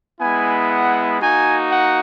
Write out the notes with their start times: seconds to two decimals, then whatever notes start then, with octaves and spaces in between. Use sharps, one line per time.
0.21 G#3 B3 E4 G#5
0.71 F#5
1.21 A#3 D#4 F#4 G#5
1.72 F#5